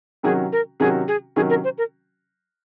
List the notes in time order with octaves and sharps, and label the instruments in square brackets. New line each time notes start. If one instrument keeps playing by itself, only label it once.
[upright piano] C3 D#3 F#3 C#4 F#4 [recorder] G#4
[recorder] A#4
[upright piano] C3 D#3 F#3 C#4 F#4 [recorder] G#4
[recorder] G#4
[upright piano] C3 D#3 F#3 C#4 F#4 [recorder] G#4
[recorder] A#4
C5
A#4